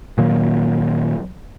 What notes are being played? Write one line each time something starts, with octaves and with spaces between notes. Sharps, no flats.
A#2 D#3 F#3 A#3